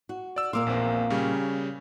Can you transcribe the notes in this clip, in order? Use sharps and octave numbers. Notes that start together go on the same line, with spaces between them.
F#4
D5 E6
A#2 A#3 F5 C6 D6 E6
A#1 E2 C4
C#3 G3 C#4